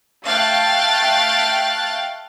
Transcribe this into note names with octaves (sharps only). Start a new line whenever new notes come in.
A3 F5 G5 F#6 A6